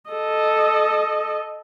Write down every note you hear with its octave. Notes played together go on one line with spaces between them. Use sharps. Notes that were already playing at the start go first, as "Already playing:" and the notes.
A4 D#5